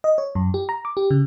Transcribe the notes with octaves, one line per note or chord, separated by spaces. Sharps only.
D#5
C#5
F#2
G4
A#5
D6
G4
C#3